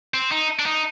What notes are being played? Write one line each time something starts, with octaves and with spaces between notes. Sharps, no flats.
C4
D#4
D4
D#4